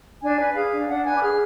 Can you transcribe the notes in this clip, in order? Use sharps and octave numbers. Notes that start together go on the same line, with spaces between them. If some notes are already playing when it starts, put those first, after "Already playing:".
D4 G#5
B4
G#4 F5
D4
D4 F#5
B4 G#5
D6
G#4 F6